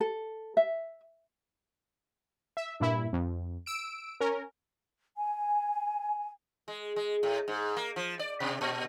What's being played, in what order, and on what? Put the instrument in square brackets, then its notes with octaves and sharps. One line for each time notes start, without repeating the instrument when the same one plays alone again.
[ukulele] A4
E5
[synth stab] E5
G2 A#2 E4
F2
E6 D7
C#4 A#4
[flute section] G#5
[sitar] G#3
G#3
A2
G#2
A#3
F3
D5
B2
A#2